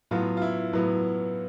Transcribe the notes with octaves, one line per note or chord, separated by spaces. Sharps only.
A2 F#3 B3 F4
F4
E4
A2 F#3 B3